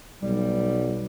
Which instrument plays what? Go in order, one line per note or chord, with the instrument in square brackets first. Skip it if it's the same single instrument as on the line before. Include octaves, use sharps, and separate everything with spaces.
[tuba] B1 [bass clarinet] G3